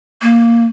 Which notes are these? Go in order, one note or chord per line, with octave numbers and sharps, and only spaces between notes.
A#3